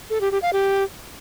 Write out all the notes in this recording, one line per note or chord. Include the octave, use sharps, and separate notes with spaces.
A4
G4
G4
F5
G4